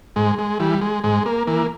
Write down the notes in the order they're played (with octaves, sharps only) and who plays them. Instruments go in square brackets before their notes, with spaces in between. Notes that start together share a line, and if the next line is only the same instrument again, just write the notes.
[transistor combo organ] G#2 G#3
G#3
E3 G3
G#3
G#2 G#3
A#3
E3 A#3